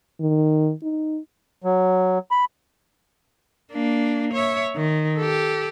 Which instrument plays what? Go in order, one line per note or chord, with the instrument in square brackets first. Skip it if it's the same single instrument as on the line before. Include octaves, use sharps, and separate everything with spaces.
[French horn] D#3
D#4
[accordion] F#3
B5
[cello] A#3 D4
C#5 E5
D#3
G4 A4